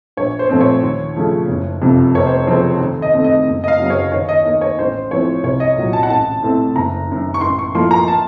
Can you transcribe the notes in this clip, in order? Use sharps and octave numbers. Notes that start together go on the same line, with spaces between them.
A#1 C#5
C5
A#2 F3 A3 C4
C#5
D#2
C#3 F3 A3
F#1
F2 C3 F3
F1 C#5
C5
F2 C#3 F3 C4 C5
D#2
D#5
D#3 A3 C4
D#5
F#1
D#5
F5
F#2 C#3 F#3
C#5
D#2 C#5
D#5
D#3 A#3 D#5
C#5
A1 C5
A2 F3 C4 C#5
C2 C#5
D#5
A#2 F#3
A5
F#5
A1 A5
A2 A3 C4
F#1 A#5
F#2 D#3
C#6
A1 C6
C#6
A2 F3 A#3 C6
A#5
A5